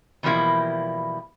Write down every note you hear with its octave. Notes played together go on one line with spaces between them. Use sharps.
B2 E3 F3 G3 A#3 E4